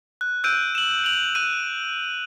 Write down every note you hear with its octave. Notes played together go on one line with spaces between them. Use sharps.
F#6
E6 F#6 G6 D7 D#7
E7 F#7
D7 F7 F#7
F#6 D#7